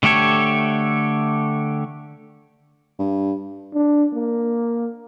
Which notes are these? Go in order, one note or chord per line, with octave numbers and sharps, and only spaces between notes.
D3 A3 G4 A4 C#5
G2
D4
A#3